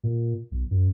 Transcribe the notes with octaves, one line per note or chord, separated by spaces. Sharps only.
A#2
B1
F#2